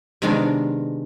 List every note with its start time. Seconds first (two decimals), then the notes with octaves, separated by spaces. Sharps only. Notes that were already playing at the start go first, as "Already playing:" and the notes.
0.22 C3 D#3 G#3 B3 D4 A#4